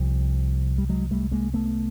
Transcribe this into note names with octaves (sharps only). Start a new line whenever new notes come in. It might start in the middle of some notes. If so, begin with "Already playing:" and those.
Already playing: C2 C3 F3 G3
G3
F#3 G#3
G3 A3
G#3 A#3
A3 B3